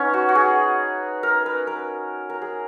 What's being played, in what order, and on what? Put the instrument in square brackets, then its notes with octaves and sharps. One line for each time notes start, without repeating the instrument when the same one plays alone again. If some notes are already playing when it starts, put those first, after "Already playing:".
Already playing: [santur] B3 C#4 D#4
F#4
F#4
G#4
A#4
B4
A#4
A#4
G#4